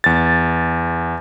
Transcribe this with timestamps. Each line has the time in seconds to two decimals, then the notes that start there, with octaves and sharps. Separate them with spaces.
0.04 E2 A6